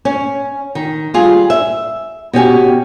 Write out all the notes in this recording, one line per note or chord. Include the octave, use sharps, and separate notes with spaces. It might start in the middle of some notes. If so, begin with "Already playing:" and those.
C#4
D#3
G3 F4 G#4
E5
B2 C#4 G4 G#5